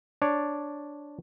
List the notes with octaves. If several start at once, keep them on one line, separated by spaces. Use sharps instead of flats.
D4 C#5 D5